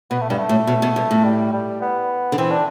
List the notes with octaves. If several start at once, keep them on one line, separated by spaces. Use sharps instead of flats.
B2 B3
A3
G2 G3
A3
A2
B2
B2
G2
A2
G3
G3
B3
D3
E3 C4
D4